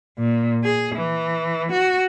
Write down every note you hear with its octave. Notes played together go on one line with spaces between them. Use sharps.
A#2
G#4
E3
F#4